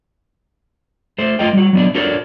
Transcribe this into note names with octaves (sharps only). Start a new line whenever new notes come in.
A3 C5
A3 F4 A#4 D#5 G5
G3 F#4
F#3 B3 D4
D4 F#4 A4 A#4 C#5